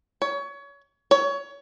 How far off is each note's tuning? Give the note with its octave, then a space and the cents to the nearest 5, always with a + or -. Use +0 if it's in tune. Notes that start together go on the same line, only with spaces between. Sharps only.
C#5 +25
C#5 +25